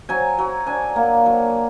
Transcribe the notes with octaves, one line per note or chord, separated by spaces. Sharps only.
F#3 G#5
F#3
D4 G#5
A#3
F#3